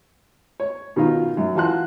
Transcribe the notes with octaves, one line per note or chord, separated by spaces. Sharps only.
C#5
B2 D#3 D#4 F4
F#2
E3 F4 F#4 A5 C6 F#6